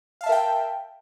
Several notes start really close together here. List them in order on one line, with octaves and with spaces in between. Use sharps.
F5 A5 E5 A#4 G5